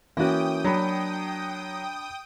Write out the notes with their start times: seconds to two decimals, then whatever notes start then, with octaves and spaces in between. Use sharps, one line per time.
0.17 E3 A#3 C#4 F#4 G5 D#6
0.64 F#3 D4 B5